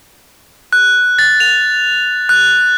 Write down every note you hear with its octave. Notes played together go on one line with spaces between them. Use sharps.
F#6
A6
F7
F#6